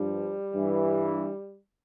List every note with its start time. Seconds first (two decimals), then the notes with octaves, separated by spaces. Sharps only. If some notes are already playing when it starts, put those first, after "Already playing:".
Already playing: G2 F3 G3
0.54 G2 E3